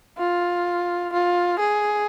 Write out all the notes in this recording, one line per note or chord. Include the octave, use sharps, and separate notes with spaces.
F4
F4
G#4